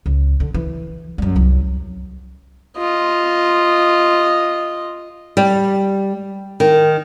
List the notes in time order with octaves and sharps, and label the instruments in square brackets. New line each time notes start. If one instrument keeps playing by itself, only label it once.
[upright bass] C#2
D3
E3
F#2 G3
C2 F#3
[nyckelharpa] F4 D#5
[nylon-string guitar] G3
D#3